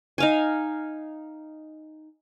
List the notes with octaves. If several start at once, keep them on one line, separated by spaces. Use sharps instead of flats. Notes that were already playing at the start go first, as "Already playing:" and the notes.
D#4 F5 G#5